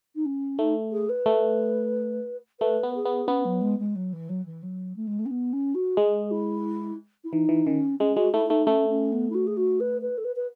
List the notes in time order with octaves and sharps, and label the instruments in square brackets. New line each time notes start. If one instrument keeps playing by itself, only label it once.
[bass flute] D#4
C#4
[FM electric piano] A3 [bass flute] D#4
[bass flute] G#4
B4
[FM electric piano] A3
[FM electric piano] A3 [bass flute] B4
[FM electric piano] B3
[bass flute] G#4
[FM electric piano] B3
[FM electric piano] B3 [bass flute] C#4
[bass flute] F#3
G#3
G#3
F#3
E3
F#3
E3
F#3
A3
G#3
A3
C#4
B3
C#4
F#4
[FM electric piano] G#3 [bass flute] G#4
[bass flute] E4
E4
[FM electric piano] E3 [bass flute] D#4
[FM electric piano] E3
[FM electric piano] D#3 [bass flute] C#4
[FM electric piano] G#3 [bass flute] C#4
[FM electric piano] G#3 [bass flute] F#4
[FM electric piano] A3 [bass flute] E4
[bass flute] E4
[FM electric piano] A3 [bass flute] D#4
[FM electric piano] A3 [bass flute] C#4
[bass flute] C#4
B3
E4
F#4
G#4
F#4
B4
B4
A4
B4
B4